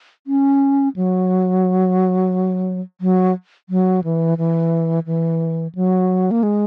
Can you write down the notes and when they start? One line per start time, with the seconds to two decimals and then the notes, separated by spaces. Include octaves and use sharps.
0.27 C#4
0.96 F#3
3.01 F#3
3.69 F#3
4.04 E3
4.38 E3
5.06 E3
5.75 F#3
6.31 A#3
6.43 G#3